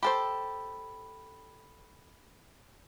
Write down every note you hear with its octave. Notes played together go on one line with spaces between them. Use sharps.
G4 A4 C5 B5